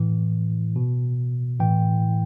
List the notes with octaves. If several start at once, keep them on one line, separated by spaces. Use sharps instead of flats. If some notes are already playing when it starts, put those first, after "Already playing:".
Already playing: A2 E3
B2
A2 E3 G5